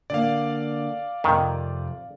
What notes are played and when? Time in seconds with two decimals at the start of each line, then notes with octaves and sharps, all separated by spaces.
0.10 D3 A#3 D5 F5
1.24 F2 C3 D#3